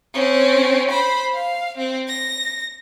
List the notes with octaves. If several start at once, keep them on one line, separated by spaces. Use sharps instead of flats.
C4 C#4
C5 B5
F5
C4
A#6